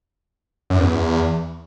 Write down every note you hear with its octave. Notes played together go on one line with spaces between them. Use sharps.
F#2
E2